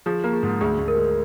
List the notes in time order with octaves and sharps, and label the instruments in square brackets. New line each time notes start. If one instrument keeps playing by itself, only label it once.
[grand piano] F3 [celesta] G#4
[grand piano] A#3
[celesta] G#4
[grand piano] G#2
[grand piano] D2 [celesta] G#4
[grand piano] D2
[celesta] A#4
[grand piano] G#3